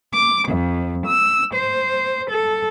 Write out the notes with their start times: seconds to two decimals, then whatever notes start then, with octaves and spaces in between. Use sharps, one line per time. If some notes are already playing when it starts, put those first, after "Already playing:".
0.14 D6
0.49 F2
1.06 E6
1.54 C5
2.29 A4